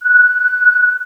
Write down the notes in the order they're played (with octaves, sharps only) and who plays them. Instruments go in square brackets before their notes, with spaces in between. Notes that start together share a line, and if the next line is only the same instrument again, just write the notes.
[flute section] F#6